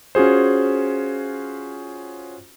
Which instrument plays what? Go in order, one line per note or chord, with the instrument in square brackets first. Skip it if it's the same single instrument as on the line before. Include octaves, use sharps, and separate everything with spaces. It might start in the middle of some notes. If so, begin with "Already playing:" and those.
[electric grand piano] C#4 F4 F#4 G#4 C5